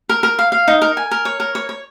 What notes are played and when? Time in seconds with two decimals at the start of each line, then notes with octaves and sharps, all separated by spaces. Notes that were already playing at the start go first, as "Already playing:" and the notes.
0.09 A#4
0.23 A#4
0.39 F5
0.52 F5
0.68 D#4
0.82 A#4
0.97 G#5
1.11 A#4
1.25 C#5
1.40 A#4
1.55 C#5
1.69 C#5